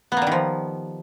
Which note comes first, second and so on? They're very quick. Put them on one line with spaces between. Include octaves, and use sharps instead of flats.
B3 A#3 G3 D#3 F3